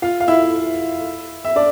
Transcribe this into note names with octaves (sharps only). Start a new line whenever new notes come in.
F4 F5
F5
E4 E5
E5
D4 D5